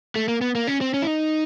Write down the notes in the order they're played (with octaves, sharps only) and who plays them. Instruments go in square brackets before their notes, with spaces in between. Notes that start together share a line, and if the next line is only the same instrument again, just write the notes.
[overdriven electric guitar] A3
A#3
B3
A#3
C#4
C4
C#4
E4
D#4